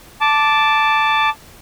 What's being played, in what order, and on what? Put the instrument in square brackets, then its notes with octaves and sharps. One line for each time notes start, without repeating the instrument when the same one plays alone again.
[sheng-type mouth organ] A5 D6